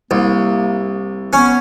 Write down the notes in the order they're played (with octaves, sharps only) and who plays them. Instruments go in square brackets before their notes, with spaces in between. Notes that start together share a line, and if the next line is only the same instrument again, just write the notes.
[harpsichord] C2 [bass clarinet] A#3
[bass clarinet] B3 [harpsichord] C#4